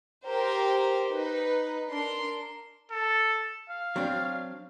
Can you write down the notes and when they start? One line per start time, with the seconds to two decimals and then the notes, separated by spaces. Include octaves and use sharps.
0.26 G4 A#4 C5
1.09 D#4 B4
1.89 D4 A#4 C6
2.91 A4
3.69 F5
3.96 F#3 C4 D4